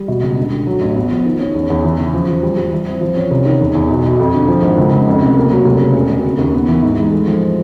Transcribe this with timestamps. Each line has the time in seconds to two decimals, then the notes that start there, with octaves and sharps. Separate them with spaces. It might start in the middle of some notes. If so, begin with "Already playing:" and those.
Already playing: G3
0.08 B2
0.22 C#2
0.37 D3
0.52 D3
0.67 F#3
0.81 A1
0.95 B3
1.11 F3
1.26 D#3
1.39 C#4
1.54 E2
1.70 E2
1.84 E3
1.99 C#3
2.14 F3
2.28 F3
2.43 G3
2.57 G3
2.72 E3
2.86 C4
3.01 F3
3.17 C#4
3.31 C2
3.46 D#3
3.61 E2
3.75 E2
3.90 B1
4.04 B2
4.19 F2
4.34 D3
4.48 F3
4.62 G#1
4.78 C#2
4.92 C#3
5.07 F2
5.22 F1
5.37 A#3
5.51 F#3
5.65 F1
5.80 C#3
5.95 E1
6.10 B2
6.24 C#3
6.39 D#2
6.54 B3
6.68 E3
6.82 G#2
6.98 G#3
7.12 A3
7.27 F3